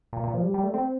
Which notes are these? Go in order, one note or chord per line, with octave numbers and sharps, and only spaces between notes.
A#2
A#2
F3
G3
G3
A3
C4